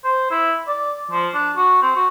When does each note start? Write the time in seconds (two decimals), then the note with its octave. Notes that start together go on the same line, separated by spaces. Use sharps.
0.04 C5
0.31 E4
0.67 D5
1.11 F3
1.34 D4
1.56 F#4
1.82 C4
1.95 F#4